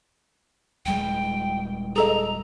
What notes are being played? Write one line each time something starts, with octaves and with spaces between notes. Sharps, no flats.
D#1 G3 G#3 G5
G#4 A4 D#5 A#5